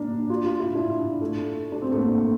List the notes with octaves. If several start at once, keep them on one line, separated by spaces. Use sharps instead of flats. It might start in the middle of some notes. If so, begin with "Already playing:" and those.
Already playing: A#3 D4
F4
F4
E4
D4
A3
D4
C4
A3
A#3